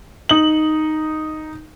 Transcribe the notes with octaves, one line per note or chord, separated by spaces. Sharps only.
D#4 F#7